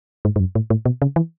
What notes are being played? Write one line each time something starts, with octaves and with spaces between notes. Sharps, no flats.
G#2
G#2
F#2
A2
A2
B2
C#3
E3